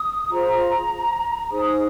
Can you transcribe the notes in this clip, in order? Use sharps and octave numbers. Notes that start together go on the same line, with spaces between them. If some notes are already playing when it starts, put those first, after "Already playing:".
Already playing: D#6
F4 G#4 C5 A#5
D#4 G#4 C5 D#6